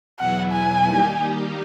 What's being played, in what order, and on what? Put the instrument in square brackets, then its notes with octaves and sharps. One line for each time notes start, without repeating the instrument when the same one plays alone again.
[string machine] E2 B2 F#3 B3 E4 [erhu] F#5
[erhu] G#5
[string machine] D#3 G3 A#3 D#4 G4